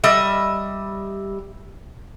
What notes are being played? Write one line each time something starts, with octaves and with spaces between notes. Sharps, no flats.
G3 D#5 E5